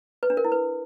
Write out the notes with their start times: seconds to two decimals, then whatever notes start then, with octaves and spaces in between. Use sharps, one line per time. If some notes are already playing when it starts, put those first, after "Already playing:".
0.23 B4
0.30 D4
0.37 A#4
0.45 E4
0.52 B4